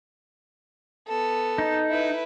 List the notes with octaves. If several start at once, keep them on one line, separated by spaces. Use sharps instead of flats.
B3 A4
D#4
E4 B4